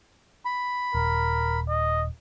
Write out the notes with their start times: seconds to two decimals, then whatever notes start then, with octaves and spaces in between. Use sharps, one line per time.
0.45 B5
0.95 D#1 A#4
1.68 D#5